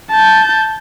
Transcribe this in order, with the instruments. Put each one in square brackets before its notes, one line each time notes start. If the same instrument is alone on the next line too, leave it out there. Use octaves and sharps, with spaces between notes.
[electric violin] A5 G6